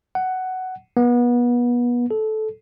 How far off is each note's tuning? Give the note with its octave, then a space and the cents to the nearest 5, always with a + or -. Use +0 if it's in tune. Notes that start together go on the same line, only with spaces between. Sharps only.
F#5 +10
B3 -30
A4 -15